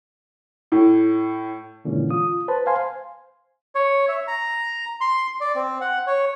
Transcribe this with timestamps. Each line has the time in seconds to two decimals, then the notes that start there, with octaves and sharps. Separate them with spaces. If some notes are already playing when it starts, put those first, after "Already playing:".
0.72 A2
1.85 G2 A#2 D3 E3 G#3 C#4
2.10 F4 D#6
2.48 B4 C5 A5
2.66 C5 F5 G#5 C6
3.75 C#5
4.08 E5
4.28 A#5
5.01 C6
5.40 D5
5.55 C4
5.81 F#5
6.07 C#5